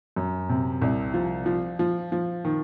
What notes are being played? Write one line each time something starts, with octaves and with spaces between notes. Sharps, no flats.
F#2
C3
C2
F3
F3
F3
F3
D#3